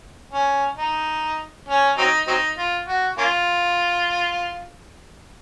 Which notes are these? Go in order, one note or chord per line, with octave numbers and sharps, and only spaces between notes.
C#4
D#4
C#4
F#3 C4 D#4
F#3 C4 D#4
F4
F#4
A#3 C#4 F4